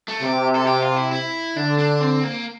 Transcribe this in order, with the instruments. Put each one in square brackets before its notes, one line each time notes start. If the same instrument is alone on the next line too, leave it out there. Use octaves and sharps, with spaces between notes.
[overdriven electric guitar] A3
[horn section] C3 [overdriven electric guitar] G4
[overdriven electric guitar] A4
G4
F4
E4
E4
[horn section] D3 [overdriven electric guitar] D4
[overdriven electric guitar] D4
C4
A#3